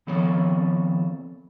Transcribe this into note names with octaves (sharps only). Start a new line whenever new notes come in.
D#3 F3 B3 C4 A4 C#5